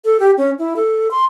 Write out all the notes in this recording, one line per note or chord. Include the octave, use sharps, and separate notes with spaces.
A4
G4
C#4
E4
A4
C6